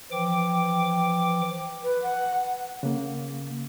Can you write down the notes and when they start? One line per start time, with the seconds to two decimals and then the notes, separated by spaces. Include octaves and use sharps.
0.12 E3 F3 G5 D6
1.84 B4
2.02 F#5
2.83 C#3 A#3